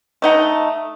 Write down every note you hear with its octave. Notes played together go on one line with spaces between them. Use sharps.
A3 D#4 F#5